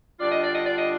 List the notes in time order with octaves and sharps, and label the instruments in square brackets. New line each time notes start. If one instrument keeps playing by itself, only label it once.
[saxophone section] D3 G3 D4 F4 D5
D#5
D5
D#5
D5
D#5